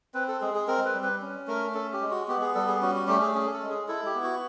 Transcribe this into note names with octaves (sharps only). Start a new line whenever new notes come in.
C4 B4
A4
G#3 G#4
G#4
C4 A#4
B4
G3
B4
C#4
A3 A#4
C#4 A4
G4
G#3
F#4
B3 G4
G#4
G3 A4
G#4
C#4 F#4
F#4
A3 G4
G#4
C#4 G#4
A4
G#3
G#4
E4 A4
G4
B3
F#4